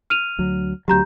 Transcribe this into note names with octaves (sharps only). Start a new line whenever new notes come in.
F6 D#7 F7
D2 F#3
D2 F#3 G4 A#5 G6